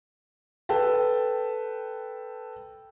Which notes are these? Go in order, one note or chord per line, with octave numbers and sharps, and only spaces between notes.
A4 B4 G5 A5